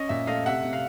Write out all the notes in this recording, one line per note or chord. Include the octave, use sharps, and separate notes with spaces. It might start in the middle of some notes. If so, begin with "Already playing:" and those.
Already playing: C#4 D#5
A#2 E5
A3 D#5 F5
C3 E5 F#5
C3
F5